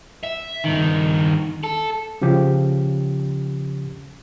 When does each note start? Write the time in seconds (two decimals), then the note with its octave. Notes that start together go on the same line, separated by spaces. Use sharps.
0.23 E5
0.64 G2 D#3
1.64 A4
2.22 C#3 F3 C#4 G4